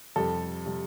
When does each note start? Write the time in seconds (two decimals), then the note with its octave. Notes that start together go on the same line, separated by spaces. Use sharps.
0.16 F2 C3 G3 A4
0.66 C3 G3